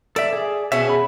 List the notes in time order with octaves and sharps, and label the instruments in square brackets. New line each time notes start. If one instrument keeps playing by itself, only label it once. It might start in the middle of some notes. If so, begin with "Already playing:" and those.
[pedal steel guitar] A4 E5 [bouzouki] D5
[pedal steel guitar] G#4
[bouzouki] B2 C#4 G#4 [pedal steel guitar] E5
[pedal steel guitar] B5